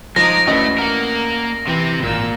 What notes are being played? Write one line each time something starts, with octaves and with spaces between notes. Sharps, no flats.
F3 G#3 D#4 A#5 D6 D#6 A#6
D2 E3 A3 C#4 D#5
A#3 A#4 F#5
C3 E3 C4
G#1 A#2 A#3 E6